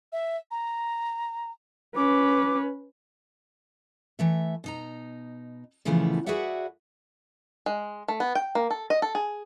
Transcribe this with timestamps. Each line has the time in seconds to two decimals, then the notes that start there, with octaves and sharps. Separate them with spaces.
0.12 E5
0.51 A#5
1.96 C#4 B4 D6
4.19 E3 A3 E5
4.64 B2 D#4 A#5
5.85 A#2 C#3 E3 F3 A3 B3
6.26 F#4 G#4 B4 D5 E5 F#5
7.66 G#3
8.08 A3
8.20 B3
8.35 G5
8.55 A#3
8.70 A4
8.90 D#5
9.02 A4
9.15 G#4